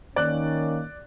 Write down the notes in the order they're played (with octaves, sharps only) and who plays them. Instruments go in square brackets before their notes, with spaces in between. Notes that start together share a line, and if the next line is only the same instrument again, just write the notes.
[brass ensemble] D#3 A#3 C#4 [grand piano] D5 F#6